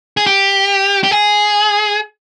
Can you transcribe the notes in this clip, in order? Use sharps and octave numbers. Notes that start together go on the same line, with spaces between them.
G#4
G4
G4
G#4